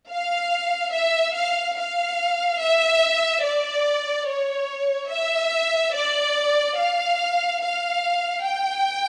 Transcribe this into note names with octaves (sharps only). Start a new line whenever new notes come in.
F5
E5
F5
F5
E5
D5
C#5
E5
D5
F5
F5
G5